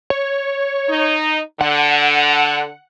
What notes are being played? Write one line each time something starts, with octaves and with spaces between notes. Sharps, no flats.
C#5
D#4
D3 F#5